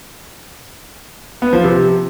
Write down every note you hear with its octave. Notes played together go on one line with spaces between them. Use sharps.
B3
F3
C3